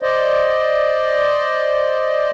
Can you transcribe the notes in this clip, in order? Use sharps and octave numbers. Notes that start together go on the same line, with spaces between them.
C5 D5 D#5